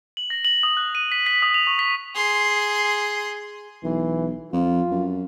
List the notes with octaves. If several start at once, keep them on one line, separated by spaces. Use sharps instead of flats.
F#7
A#6
F#7
D#6
F#6
D#7
B6
B6
D#6
F7
C#6
B6
G#4 C6
B1 E3
F2 F4
F#2